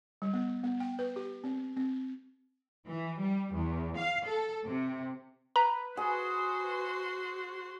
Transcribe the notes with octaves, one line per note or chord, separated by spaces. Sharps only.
G3
B3
B3
G5
B4
G4
C4
C4
E3
G3
E2
F5
A4
C3
B4 A#5
F#4 G#4 C5 F#5 C6